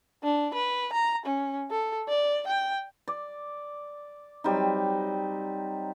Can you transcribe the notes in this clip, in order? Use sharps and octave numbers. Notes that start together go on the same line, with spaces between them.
D4
B4
A#5
C#4
A4
D5
G5
D5
F#3 G3 C4 D#4